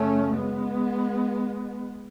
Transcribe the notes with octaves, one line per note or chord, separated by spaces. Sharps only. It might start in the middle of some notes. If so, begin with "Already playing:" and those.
Already playing: F#2 C#3 A3 C#4
G#3 B3